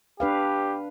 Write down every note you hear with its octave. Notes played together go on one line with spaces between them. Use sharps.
D4 G4 B4 F5